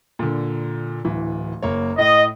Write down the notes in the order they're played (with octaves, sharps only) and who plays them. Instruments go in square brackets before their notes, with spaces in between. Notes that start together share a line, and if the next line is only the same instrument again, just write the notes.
[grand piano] A#2 D3
D1 E3
F#1 A#3 C#5
[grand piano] A2 [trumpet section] D#5